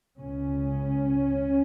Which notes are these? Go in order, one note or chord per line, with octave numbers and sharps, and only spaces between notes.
C#2 C#3 C#4